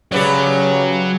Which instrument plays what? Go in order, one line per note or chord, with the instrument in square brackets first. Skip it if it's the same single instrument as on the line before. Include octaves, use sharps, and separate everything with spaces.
[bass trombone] C#3 [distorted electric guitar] F#3 [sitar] G4 B4 D5